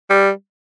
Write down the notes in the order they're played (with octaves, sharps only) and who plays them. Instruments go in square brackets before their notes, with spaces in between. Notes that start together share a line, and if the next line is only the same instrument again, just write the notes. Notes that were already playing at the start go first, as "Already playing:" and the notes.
[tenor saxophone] G3